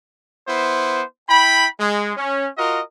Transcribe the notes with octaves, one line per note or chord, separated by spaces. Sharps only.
B3 E4 C5
E4 G5 B5
G#3
C#4
F4 F#4 A#4 D#5